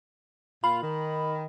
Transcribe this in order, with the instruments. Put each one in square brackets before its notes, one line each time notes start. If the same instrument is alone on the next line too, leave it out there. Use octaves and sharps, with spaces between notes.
[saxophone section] A#2 F4 [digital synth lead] B5
[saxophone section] D#3